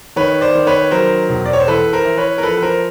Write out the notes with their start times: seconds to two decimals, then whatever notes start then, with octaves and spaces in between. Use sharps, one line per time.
0.16 D#3 B4 C#5
0.41 C5 D5
0.55 D#3
0.67 B4 C#5
0.91 F#3 A#4 C5
1.29 E1
1.46 D5
1.53 C#5
1.60 C5
1.67 E3 A4 B4
1.93 A#4 C5
2.05 E3
2.18 B4 C#5
2.38 A#4
2.43 F3 A4 B4
2.57 B4
2.63 A#4 C5